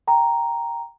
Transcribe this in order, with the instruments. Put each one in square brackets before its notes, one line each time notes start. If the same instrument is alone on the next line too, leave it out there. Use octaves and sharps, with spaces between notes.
[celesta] G5 A#5